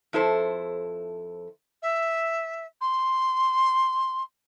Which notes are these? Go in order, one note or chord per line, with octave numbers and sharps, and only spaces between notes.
F2 E4 A4 C5
E5
C6